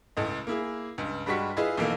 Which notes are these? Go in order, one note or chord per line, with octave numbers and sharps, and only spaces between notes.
C#2 A2 D#5
A#3 E4 G#4
C#2 G2
G2 G3 G#3 F#4 C#6 B6
E4 F4 G#4 B4 D#5
B1 F2 E3 A3 A#3